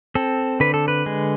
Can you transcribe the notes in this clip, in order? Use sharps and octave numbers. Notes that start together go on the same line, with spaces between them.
C4 A4
D3 B4
A4
B4
G#3